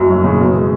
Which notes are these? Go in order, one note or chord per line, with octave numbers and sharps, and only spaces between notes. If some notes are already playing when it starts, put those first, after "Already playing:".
Already playing: F#1 F#2
F#3
C#3
B2
G#3